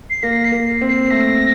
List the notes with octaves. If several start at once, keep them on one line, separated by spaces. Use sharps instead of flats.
C7
A#3 A#6
C7
A#3
C4
C7
A3 A#6